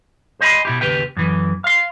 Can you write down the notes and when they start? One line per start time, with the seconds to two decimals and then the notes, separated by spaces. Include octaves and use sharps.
0.41 C5 D#5 G#5 B5 C6
0.65 B2 E4 G4
0.81 D#2 C#3 G4 B4 G5
1.17 F#2 E3
1.64 F5 C6